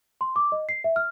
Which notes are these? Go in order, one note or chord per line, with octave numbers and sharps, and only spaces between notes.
C6
D6
D#5
C7
E5
F6